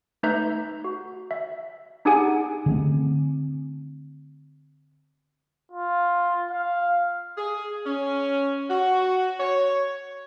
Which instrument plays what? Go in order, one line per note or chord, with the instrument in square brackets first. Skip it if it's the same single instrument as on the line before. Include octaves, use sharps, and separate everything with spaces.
[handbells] A3 D#4 B4 E5 A#5 G6
F#4
E5
D4 D#4 G4 G#4 F#5 G#5
[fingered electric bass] D3 A3 C4
[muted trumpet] F4
F5
[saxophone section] G#4
C#4
F#4
C#5